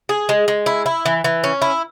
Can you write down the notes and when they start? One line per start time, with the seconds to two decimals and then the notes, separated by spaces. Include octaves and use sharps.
0.09 G#4
0.29 G#3
0.48 G#3
0.66 E4
0.86 E4
1.06 E3
1.24 E3
1.44 C#4
1.62 E4